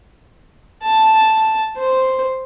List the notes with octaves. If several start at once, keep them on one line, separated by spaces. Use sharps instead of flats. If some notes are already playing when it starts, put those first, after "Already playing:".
A5
C5